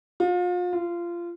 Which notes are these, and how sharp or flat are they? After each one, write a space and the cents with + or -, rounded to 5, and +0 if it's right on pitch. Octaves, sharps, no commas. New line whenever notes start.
F4 +35
F4 -20